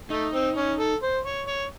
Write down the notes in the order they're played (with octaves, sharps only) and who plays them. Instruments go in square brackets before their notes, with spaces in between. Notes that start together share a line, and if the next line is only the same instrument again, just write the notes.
[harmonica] A3 [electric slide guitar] D#4
[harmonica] C4
C#4
A4
C5
C#5
C#5